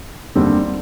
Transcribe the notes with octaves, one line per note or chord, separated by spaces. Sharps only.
D#2 D3 G3 C4